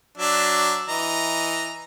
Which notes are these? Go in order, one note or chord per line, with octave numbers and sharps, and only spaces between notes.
F#3 D4 E5
E3 D#5 A#5